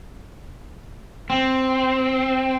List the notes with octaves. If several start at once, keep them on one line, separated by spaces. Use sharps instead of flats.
C4